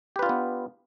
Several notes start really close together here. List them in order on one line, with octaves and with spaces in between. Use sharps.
G4 B4 F4 D4 B3